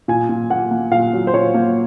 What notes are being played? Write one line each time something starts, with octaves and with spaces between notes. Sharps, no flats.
A#2 G#5
A#2
A#3 F#5
A#3
A#2 F5
F#3
C5
A#2 C#5
A#3